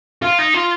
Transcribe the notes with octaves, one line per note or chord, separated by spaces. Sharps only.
F4
D#4
F4